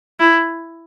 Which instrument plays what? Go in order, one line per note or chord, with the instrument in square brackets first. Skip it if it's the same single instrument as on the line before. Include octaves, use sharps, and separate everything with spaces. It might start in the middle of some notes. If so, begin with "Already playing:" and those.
[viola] E4